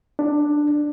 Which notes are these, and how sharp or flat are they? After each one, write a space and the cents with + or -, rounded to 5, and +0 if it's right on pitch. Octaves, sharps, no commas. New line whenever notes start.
D4 +10